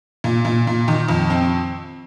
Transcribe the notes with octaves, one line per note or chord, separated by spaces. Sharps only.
A#2
A#2
A#2
D#3
F2
C4